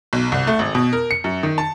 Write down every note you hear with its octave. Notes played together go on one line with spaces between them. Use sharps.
B1
C2
A3
G#1
B2
A#4
C#7
F#2
D#3
A5